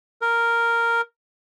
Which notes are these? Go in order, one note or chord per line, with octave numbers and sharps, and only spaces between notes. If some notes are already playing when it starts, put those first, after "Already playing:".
A#4